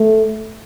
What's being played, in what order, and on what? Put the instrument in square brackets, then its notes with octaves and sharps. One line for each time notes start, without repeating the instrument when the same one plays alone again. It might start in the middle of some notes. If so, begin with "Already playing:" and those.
Already playing: [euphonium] A3